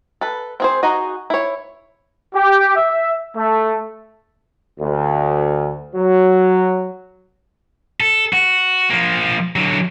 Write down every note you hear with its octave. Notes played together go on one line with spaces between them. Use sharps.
A4 B4
C4 G#4 C5
D#4 F#4 G#4 D#5
E4 C#5
G4
E5
A3
D2
F#3
A4
F#4
F3 A#3
D3 F#3